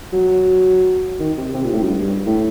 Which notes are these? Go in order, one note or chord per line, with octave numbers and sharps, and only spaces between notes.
F#3
D#3
C3
C3
A#2
A2
F#2
G2
A2